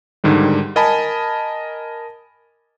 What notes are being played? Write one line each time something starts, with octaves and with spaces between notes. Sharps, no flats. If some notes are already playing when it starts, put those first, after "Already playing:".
G#2 D3 D#3 G3
A#4 D#5 G#5 A5 B5